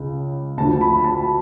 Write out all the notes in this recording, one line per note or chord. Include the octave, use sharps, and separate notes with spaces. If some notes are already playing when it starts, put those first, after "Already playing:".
Already playing: C#2 C#3
D2 D3 F3 A5
B5
A5